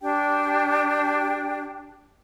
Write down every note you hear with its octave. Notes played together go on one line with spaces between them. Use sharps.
D4 G4 G5